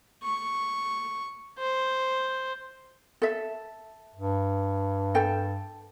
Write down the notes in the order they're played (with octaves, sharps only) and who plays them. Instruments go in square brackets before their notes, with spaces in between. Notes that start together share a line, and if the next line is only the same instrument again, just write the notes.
[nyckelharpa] C#6
C5
[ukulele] A4 E5
[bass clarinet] G2
[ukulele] A4 G5